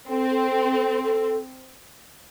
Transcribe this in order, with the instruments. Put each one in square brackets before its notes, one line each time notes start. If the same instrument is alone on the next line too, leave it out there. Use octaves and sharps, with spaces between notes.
[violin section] C4 [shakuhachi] A4
[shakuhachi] A4
A4
A4
A4